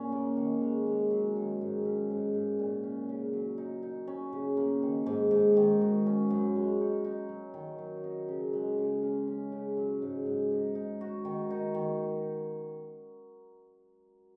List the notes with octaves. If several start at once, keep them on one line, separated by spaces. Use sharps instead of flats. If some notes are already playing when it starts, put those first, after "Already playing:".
Already playing: A#2 C#4
A#3
D#3
G#3
G#3
F#3
D#3
G#2
C#4
G#2
G#2
A#2
C#4
C#3
F#3
D#4
D#4
C#4
C#3
A#3
D#3
G#2
G#2
D#3
F#4
C#4
F#2
G#3
D#4
D#4
F#3
D#3
F#3
D#4
C#3
G#3
C#3
C#4
C#4
C#3
F#3
G#2
G#2
D#4
D#4
F#4
D#3
D#4
D#3